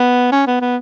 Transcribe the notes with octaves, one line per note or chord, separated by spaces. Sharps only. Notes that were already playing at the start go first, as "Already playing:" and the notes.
Already playing: B3
C#4
B3
B3